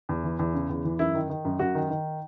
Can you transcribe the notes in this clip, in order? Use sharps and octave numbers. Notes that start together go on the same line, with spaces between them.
E2
E3
E2
C#3
E2
E3
F#2 E4
D#3
D#3
F#2
F#2 F#4
D#3
D#3